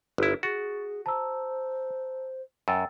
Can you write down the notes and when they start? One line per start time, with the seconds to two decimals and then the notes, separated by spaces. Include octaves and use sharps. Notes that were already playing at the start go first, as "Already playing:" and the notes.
0.18 G1 E4
0.43 F#4 G#4 C#6 A6
1.06 C5 A5 A#5 E6
2.68 F#2 G5 E6 A6